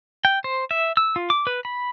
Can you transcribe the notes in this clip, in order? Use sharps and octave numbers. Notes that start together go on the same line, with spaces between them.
G5
C5
E5
E6
F4
D6
B4
B5